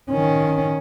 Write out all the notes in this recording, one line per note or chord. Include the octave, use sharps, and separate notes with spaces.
D#3 C#4